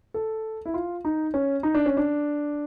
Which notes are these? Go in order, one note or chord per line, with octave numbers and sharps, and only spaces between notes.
A4
E4
F4
D#4
C#4
D#4
D4
C#4
D4